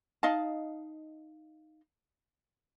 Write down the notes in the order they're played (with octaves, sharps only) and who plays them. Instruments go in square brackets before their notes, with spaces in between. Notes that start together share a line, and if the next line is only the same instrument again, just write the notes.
[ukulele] D#4 D#5 F5 A5